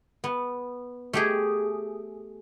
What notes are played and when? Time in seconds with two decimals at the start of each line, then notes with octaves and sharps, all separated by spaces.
0.24 B3
1.13 A3 G4 G#4